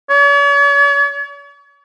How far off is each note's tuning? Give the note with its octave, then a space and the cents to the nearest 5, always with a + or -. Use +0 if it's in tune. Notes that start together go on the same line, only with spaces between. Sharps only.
C#5 +45